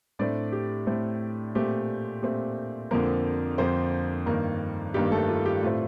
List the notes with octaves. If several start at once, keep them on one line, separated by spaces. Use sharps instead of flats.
A2 A3 C4 D4 D5
G4
A2 A3 C4
A#2 A3 C4 G4
A#2 A3 C4 G4
F2 D3 F3 A#3 C4 A#4
F2 D3 F3 C4 C5
G2 D#3 A#3 A#4
G2 D#3 A#3 G4
A3 A4
F4
G4
A2 A3 C4 F4